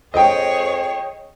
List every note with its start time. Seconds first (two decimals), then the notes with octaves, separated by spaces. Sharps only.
0.14 F2 G#4 C#5 D#5 G5